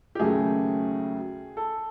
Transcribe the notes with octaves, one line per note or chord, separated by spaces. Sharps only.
G4
D#2 C#3 F#3 A3 G#4
A4